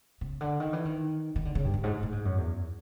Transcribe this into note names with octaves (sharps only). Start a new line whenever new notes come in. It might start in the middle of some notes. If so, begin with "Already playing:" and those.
C#3
D3
D#3
E3
D#3
D#3
D3
C#3
G2
F#2
G#2
A2
G#2
F#2
E2